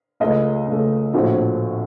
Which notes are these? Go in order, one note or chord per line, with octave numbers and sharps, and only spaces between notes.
C#2 C#3 A3 D#5
C#2 C#3 A3
A#1 A2 F3 A3 C4 F#4 F#5